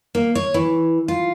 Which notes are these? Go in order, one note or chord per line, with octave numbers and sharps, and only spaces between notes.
A#3
C#5
E3
F4